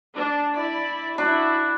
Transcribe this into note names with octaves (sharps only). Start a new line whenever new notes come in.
D4
E4 D5 B5
D4 E4 F#4